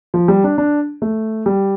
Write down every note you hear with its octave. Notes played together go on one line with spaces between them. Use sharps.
F3
G3
D4
D4
A3
G3